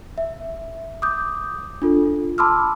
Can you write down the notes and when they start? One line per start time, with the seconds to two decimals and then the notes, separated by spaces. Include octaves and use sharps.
0.18 E5
1.02 D6 D#6 G6
1.82 D4 F4 A4
2.38 A5 B5 C6 D6 E6 F6